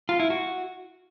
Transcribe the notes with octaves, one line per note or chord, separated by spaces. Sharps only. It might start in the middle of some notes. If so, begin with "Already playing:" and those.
F4
E4
F#4